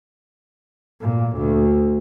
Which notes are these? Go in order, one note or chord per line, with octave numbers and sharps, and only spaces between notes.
A#2
D2